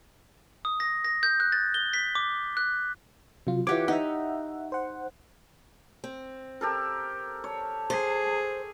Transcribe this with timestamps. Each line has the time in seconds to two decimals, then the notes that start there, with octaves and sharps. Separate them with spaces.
0.65 D#6
0.80 A#6
1.05 A#6
1.23 G6
1.40 F#6
1.52 A6
1.74 G7
1.94 B6
2.15 D6
2.57 F#6
3.47 C3 F#3 F4
3.67 E3 F4 G4 C#5 F#5 D6
3.88 D#4 E5 F#5
4.72 C5 F#5
6.04 C4
6.61 G4 A4 A#4
7.44 C#5 A5
7.90 G#4 C5